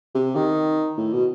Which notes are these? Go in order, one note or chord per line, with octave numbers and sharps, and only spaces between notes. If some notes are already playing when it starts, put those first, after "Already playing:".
C3
D#3
A2
B2